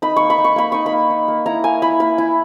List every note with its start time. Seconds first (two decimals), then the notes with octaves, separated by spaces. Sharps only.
0.02 D#4 B5
0.16 A#3 C#6
0.30 B5
0.38 D#4
0.44 C#6
0.56 A#3 B5
0.72 D#4 C#6
0.86 B5
0.92 A#3
1.10 D#4
1.28 A#3
1.46 E4 A#5
1.64 A#3 G#5
1.82 E4 B5
2.00 A#3 B5
2.18 E4